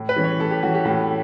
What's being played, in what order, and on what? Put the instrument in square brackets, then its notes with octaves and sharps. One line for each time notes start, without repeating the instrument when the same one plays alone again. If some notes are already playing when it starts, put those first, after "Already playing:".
Already playing: [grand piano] A2
B4
E3 G3 C#4
C#5
A2 A4
G4
E3 G3 C#4 F#4
G4
A2 A4